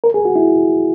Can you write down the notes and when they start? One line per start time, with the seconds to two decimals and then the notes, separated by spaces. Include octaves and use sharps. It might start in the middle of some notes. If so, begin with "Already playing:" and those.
0.04 A#4
0.14 G#4
0.25 F#4
0.36 E4